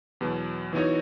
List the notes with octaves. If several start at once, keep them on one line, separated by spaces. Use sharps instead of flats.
E2 B2 F#3
E3 B3 D#4 F#4 C#5